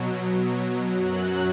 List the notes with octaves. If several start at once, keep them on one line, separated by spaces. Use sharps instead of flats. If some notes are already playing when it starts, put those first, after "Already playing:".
Already playing: B2 F#3
F#2 F#3 F#6